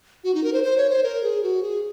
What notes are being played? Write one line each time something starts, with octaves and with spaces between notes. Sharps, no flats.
F#4
D#4
A#4
C5
C5
C#5
C5
A#4
G#4
F#4
G#4